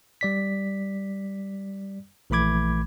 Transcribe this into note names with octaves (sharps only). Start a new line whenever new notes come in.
G3 D5 B6
A#1 E3 A3 B5 D6 G#6